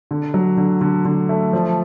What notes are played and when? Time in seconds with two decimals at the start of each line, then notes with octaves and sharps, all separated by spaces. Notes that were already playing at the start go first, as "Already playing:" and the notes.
0.11 D3
0.34 F#3
0.57 D3
0.81 D3
1.05 D3
1.29 A3
1.53 F3